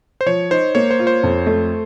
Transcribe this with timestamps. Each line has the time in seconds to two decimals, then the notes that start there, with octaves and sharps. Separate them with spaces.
0.21 C5
0.26 F3 C#5
0.51 D#4 C5
0.75 A#3 C#5
0.91 C5
0.99 F4
1.07 C5
1.23 F2
1.46 A3